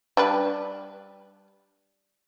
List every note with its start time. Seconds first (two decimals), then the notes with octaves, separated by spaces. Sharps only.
0.17 G3 D4 B4